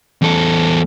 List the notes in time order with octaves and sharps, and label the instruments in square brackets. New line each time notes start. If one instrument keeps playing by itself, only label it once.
[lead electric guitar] E2 A4